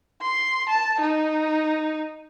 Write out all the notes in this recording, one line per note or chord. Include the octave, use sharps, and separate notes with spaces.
C6
A5
D#4